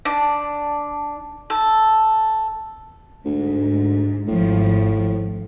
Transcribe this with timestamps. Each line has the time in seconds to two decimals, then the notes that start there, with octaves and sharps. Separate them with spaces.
0.05 D4
1.50 A4
3.25 D2 G#2
4.28 G#1 A2 F3